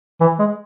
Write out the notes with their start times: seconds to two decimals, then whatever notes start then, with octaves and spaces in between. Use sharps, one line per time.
0.21 E3
0.39 G#3